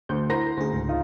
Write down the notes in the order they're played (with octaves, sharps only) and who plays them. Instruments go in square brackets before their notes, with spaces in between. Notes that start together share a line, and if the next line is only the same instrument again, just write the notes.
[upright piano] D2 [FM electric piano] G6
[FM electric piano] E4 F#5 B5 [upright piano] C5 A#5 A#6
[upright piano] D2 [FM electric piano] C#4 G#4
[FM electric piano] C#2 G#2
[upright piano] D#4 F4